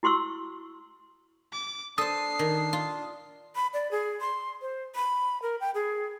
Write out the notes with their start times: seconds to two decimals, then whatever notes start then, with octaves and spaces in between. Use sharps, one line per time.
0.03 E4 F#4 C6 C#6 E6
1.53 D6
1.98 D4 A4 C5 D#6 C7
2.39 D#3
2.73 F4
3.55 B5
3.74 D5
3.91 G#4
4.21 C6
4.62 C5
4.96 B5
5.42 A#4
5.60 G5
5.75 G#4